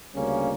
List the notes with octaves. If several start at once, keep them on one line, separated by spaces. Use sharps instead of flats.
D2 C#3 G3 A#3 C#4